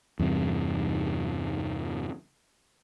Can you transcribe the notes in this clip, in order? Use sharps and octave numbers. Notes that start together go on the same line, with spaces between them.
E2 G2 C3